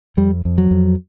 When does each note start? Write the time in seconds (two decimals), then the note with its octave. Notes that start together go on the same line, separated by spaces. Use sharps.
0.17 F2 G3
0.45 F2
0.58 F#3
0.71 F2